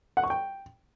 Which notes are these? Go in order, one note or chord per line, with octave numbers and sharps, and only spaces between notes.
F#5
C#6
G5